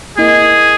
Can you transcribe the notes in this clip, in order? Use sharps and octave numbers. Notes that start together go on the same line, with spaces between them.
A#3 E4 G#4 A#4 D#5